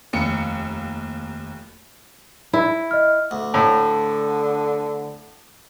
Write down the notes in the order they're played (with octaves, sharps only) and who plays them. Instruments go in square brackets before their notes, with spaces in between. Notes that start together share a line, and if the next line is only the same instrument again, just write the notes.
[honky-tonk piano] F1 D#2 C#7
[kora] E4
[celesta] D#5 F6
[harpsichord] D2
[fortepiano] A2 [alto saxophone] D3